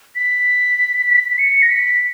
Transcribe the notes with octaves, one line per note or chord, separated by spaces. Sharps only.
B6
B6
C#7
A#6
B6